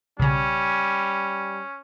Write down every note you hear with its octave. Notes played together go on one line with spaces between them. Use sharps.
B1 C#3 G3 C#4